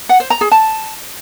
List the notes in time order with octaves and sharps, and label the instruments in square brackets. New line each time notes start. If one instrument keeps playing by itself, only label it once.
[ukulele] F#5
C5
A#5
G#4
A5